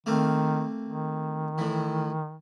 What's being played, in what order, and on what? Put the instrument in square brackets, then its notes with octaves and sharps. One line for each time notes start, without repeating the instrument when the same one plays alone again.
[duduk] D#3 [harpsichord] A3 A#3 C4
[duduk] D#3
[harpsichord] A2 E3